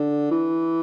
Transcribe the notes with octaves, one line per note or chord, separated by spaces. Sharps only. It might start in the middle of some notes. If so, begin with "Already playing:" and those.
Already playing: D3
E3